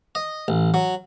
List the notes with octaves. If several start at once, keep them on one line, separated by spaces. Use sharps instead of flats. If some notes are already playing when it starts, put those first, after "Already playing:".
D#5
A1
F#3